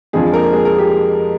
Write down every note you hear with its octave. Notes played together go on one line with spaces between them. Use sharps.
F2 D3 F3 G#3 C4 F4 G#4
A#3 A#4
G#3 G#4
A#3 A#4
G4